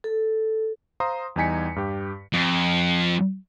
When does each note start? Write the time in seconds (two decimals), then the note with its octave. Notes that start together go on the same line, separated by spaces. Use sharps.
0.04 A4
1.00 C5 F5 A#5 C6 D#6
1.36 E2 G3 D#4 G#5 B6 C#7
1.76 G2 G4
2.33 F2